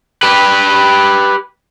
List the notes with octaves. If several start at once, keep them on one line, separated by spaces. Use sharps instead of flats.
G4 B4